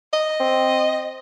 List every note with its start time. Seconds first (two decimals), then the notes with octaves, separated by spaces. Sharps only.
0.13 D#5
0.40 C4